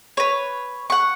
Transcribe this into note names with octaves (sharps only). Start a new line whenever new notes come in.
B4 C#5
F#5 C#6